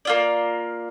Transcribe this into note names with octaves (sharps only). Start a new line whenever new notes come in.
A#3 F4 D5